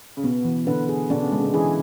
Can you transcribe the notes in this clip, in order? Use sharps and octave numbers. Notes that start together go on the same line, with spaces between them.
C#3
B2 B3
E3
B2 D3 B4
G#4
B2 D3 D4
C#3
C#3 G#3
B2
C#3 E3 G#4